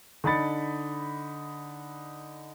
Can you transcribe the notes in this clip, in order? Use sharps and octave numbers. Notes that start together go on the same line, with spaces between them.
D3 D#4 B5 A6 C#7